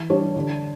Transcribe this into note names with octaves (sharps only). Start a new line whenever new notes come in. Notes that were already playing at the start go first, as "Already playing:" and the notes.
Already playing: E3
G3 D4 G4 C#5
D3